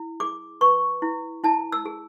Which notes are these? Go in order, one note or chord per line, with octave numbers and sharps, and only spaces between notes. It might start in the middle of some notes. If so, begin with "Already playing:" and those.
Already playing: E4
G#4 D6
B4 C#6
E4
E4 A5
E6
G#4